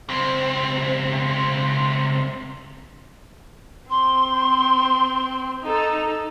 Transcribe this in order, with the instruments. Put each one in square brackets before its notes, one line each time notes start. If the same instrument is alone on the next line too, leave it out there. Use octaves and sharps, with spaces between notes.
[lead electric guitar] C#2 C4
[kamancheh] C4 [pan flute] C6
[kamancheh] D#4 A4